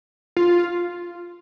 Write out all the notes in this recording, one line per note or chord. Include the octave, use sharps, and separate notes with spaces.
F4